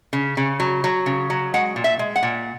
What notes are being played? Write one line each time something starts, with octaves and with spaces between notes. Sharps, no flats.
C#3
C#3
F#3
F#3
C#3
F#3
G#3 F#5
A#2
E5
G#3
F#5
A#2